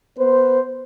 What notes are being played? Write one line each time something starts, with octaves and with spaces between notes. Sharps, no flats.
B3 B4 C5